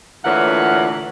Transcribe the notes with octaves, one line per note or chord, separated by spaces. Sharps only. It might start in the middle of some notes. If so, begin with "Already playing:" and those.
D2 A#2 D3 E3 C#5 F#5